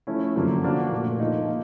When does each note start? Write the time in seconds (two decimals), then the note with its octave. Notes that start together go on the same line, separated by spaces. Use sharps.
0.07 F3 A3 C#4 E4
0.36 F#2 D3 F3 A#3
0.64 F3 A#3 D4 F#4
0.92 A#2 F3 A3
1.20 F3 A#3 D#4
1.48 A#3